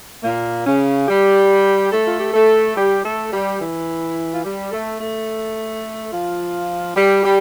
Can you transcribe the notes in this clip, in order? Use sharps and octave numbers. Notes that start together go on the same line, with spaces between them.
A#2 A#3
C#3 C#4
G3 G4
A3 A4
F4
G4
A3 A4
G3 G4
A3 A4
G3 G4
E3 E4
F4
G3 G4
A3 A4
A3 A4
F3 F4
G3 G4
G3 G4